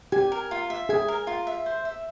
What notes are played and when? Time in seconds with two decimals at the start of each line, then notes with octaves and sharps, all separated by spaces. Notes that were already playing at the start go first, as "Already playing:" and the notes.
0.12 G4 G#5
0.32 A#4
0.51 F4
0.70 E5
0.89 G#4 G#5
1.08 A#4
1.27 F4
1.47 E5
1.66 C5
1.85 E5